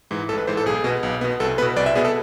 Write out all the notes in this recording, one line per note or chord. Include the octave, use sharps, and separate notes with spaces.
G#2 E3
A1 A4
B4
G#2 E3 C5
A4
B1 G#4
B2 B3
B1
B2 B3
C2 A4
B2 B3 B4
C2 D5
E5
B2 B3 G#4
A4